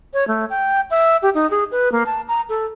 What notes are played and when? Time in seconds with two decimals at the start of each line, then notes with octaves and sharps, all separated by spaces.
0.14 C#5
0.28 A3
0.50 G5
0.91 E5
1.22 G4
1.35 D#4
1.51 G#4
1.71 B4
1.92 A#3
2.06 A5
2.28 A#5
2.49 A4